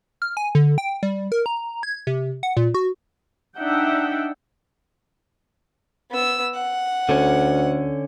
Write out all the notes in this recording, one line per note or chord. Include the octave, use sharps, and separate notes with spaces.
F6
G#5
D3
G5
G3
A#4
A#5
G#6
C3
F#5
A#2
F#4
D4 D#4 E5 F#5 G5
B3 E6
F#5
D2 D3 C#4